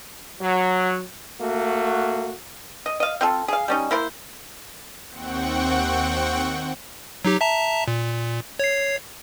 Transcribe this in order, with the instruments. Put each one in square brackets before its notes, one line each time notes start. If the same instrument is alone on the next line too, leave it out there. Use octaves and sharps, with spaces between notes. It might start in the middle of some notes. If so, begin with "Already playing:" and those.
[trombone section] F#3
A3 A#3 F#4
[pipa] D#5
D#5 F5
C4 F4 A4
G#4 F5
G3 C#4 D#4
A#3 E4 C5
[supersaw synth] D#2 C4 F#5 G5 C#6
[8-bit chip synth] F#3 D#4 G4
E5 A5 A#5
A#2
C#5 C7